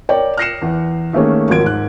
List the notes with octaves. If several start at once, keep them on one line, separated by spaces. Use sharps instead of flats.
A#4 C#5 D5 G5
F6 F#6 A#6 C7 C#7 E7
E2
D#3 A3 A#3 C#4 G#4
G#1 D#2 F3 F#3 G#6 D7
G#2 F#6